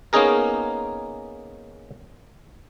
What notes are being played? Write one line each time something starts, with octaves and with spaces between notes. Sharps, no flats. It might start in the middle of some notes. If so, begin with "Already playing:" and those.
A#3 B3 C#4 D#4 G#4 A#4